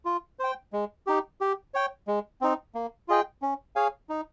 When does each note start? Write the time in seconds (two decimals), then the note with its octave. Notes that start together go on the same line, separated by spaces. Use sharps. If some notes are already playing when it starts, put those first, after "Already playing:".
0.05 F4
0.39 C5 G5
0.73 G#3
1.07 D#4 G4
1.41 G4
1.74 C#5 G5
2.08 G#3
2.41 C4 D#4
2.75 A#3
3.08 F4 G#4 D#5 G5
3.42 C#4
3.76 G#4 C#5 F5 G#5
4.09 D#4